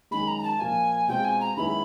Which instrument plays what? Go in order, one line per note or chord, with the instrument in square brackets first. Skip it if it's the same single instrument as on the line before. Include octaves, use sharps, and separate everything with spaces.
[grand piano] F#2 D#3 G#3 [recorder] B5
[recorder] A#5
A#5
A5
[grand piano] A#2 F3 A#3 [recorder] G#5
[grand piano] B2 G#3 C4 F4 [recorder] G5
[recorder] G#5
A#5
[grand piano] F#2 D#3 G#3 B3 E4 [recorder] B5